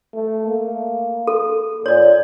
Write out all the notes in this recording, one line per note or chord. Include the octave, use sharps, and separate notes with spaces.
A3
A#3
A4
A#2 C#5 D5